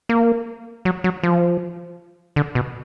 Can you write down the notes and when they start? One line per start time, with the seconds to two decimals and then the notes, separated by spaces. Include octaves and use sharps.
0.09 A#3
0.85 F#3
1.04 F#3
1.23 F3
2.36 D3
2.55 B2